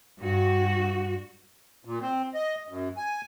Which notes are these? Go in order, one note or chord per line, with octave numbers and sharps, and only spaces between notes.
G2 F#4
A#2
C4
D#5
F#2
G#5